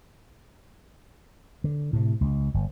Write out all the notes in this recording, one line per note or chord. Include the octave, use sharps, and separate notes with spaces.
D3
A2 C3
C#2
G1